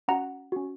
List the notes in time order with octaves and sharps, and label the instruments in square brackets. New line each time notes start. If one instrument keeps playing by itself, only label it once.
[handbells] C#4 F#4 F#5 A#5
C#4 F#4